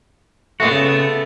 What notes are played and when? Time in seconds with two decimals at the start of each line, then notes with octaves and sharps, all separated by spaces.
0.60 A#2 G#3 A3 B3 F#4
0.72 C#3